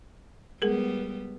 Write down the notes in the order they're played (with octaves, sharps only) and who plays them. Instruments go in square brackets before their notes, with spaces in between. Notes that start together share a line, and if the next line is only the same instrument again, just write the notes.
[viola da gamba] G3 B3 [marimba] G#3 G#4 A#4